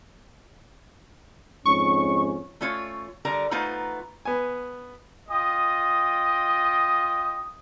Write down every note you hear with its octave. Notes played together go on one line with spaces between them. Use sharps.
F2 G#2 C#4 C#6
A3 C#4 F4 C#5
D3 G3 A#4 A#5
A3 B3 D#4 F4 C5 A#5
B3 G#5
F4 D#5 G5 D#6